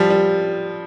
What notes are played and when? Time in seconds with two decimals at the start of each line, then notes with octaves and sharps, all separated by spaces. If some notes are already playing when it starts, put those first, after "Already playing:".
Already playing: F3 G3
0.10 G3